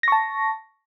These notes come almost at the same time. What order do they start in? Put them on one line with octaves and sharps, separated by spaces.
A#6 C#6 A5